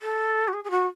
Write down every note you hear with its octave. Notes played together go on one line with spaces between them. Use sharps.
A4
F#4
G#4
G#4
F#4